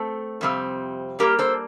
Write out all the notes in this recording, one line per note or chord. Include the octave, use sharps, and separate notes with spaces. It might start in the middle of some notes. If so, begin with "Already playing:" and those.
Already playing: A3 C4 A4
F2 C3 G3 C4
A2 G3 A#3 G4 A#4
A4 C5